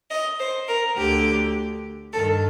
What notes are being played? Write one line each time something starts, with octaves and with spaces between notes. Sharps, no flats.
D#5
C5
A#4
D2 D3 G4
G2 D#3 A4